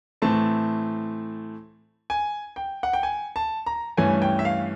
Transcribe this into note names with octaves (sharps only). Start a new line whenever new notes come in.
A2 E3 A3 C4 A5
G#5
G5
F#5
G5
G#5
A5
A#5
G2 E3 A3 C#4 G#5
G5
E5
F5